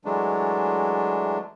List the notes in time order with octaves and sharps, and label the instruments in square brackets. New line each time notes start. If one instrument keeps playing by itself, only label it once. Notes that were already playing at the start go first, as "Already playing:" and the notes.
[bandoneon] E3 F#3 G#3 A3 D4